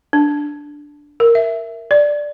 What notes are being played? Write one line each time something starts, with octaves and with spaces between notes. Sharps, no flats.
D4
A#4
E5
D5